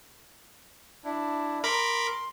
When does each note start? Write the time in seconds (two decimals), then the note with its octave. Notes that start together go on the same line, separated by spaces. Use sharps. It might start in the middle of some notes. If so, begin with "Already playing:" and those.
1.05 D4 E4
1.64 A#4 B5 C6 D6